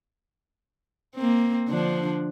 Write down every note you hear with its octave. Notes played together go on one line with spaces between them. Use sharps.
A#3 C4
D3 F3 D4